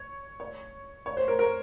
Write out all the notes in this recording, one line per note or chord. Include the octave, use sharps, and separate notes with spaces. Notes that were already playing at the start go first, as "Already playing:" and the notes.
Already playing: C#5
C#5
C#5
C5
A#4
A#4